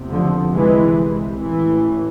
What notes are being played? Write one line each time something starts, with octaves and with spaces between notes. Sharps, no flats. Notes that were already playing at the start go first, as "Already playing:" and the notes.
Already playing: F1 E2 C3
D3 F3
C2 C3 E3 G#3
A1 A2 E3